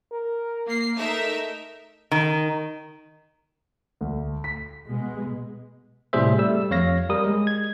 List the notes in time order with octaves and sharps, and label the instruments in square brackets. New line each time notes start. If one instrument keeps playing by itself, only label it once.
[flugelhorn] A#4
[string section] A#3 C7
[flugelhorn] A3 [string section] D#4 A#4 E5
[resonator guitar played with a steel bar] D#3
[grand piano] D2
B6
[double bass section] B2 G#3 B3
[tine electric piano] A2 C3 G3 G#4 C5 E5
G3 A3 E6
F2 C#5 F5 A#6
G3 A#4 D#6
G#3
G#6